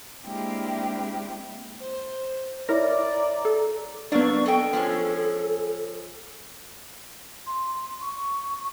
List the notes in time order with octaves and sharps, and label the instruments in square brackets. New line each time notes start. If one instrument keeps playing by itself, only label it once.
[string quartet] G#3 A#3 C4 D4 E4 G4
[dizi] C5
[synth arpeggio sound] E4 A#4 A#6 [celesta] C#5 E5 [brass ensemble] D5 [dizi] A#5
[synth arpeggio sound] A4
[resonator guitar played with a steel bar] F#3 A#3 [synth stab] B3 D4 [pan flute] C#6
[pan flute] A4 [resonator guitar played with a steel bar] D#5 G5
[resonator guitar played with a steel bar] F3 G#3 C#4
[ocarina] C6
C#6